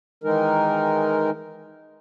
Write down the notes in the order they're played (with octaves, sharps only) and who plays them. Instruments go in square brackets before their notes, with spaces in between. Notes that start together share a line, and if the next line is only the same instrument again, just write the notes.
[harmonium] D#3 E3 G#3 D#4 A#4